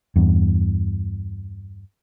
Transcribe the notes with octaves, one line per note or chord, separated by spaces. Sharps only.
E2 G2